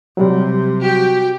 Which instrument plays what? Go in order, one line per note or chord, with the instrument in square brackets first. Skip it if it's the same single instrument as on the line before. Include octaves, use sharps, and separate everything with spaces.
[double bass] C3 [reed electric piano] F#3 G3
[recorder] F#4 [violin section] G4 G5